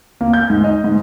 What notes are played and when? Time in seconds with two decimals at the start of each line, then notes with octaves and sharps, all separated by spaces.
0.21 A#3
0.33 G6
0.50 G#2
0.64 D#5
0.84 G#2